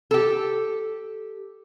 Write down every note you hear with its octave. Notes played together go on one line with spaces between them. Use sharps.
G4 A4